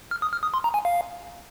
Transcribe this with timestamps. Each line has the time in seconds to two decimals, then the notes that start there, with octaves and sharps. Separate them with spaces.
0.11 F6
0.22 D#6
0.33 F6
0.43 D#6
0.54 C6
0.64 A#5
0.74 G#5
0.85 F5